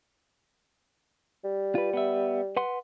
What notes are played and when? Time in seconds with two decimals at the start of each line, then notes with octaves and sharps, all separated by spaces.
1.44 G3
1.75 F4 B4
1.93 B3 E5
2.57 B4 F#5 C6